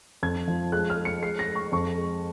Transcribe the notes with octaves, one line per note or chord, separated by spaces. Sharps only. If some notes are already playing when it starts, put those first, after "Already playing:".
F2 G#6
F3
G#3 F#6
F6
G#3
C#7
G#3 C7
A#6
G#3
C#6
F2 C#6
G#3